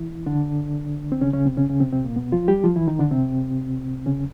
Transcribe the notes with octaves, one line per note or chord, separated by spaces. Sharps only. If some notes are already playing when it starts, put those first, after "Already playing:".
Already playing: E3 E4
D3 D4
C4
C#3 C#4
C#3 C#4
C3 C4
C#3 C#4
C#3 C#4
C3 C4
C3 C4
A#2 A#3
B2 B3
F3 F4
G3 G4
F3 F4
E3 E4
D#3 D#4
D3 D4
C3 C4
C#3 C#4